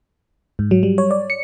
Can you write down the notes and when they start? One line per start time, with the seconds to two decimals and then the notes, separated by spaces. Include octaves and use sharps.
0.59 G#2
0.71 F#3
0.83 G3
0.98 C#5
1.11 D5
1.30 C#7